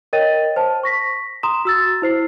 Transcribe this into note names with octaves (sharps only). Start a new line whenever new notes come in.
A#4 C#5 D#5 G5 A6 D#7
C5 A5
C#6 A#6 B6
A#5 C6 D#6 E7
F#4 E6 A6
E4 C5 C7